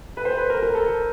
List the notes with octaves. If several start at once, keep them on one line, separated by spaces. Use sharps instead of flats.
B4
C5
B4
A#4
A#4
A4